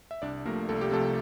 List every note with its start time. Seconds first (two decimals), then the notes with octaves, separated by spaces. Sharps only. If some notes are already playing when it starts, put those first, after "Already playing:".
0.11 E5
0.22 C2 D4 D5
0.45 C3 F3 A3 A#3 A#4
0.69 C2 A4
0.81 G4
0.91 C3 F3 A3 A4